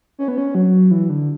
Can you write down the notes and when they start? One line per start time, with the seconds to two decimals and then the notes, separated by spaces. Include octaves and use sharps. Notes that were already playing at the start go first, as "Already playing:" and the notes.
0.19 C#4
0.28 B3
0.38 C#4
0.55 F#3
0.91 E3
1.10 D3